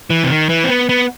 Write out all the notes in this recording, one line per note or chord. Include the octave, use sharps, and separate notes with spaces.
E3
C3
D#3
E3
C4
B3
B3